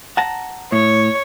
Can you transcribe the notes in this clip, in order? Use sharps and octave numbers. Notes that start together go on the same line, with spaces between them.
F#5 A5 A#5
A2 C#5